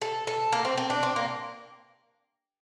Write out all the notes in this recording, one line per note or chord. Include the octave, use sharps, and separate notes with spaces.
A4
A4
A#3
C4
C4
D4
C4
A#3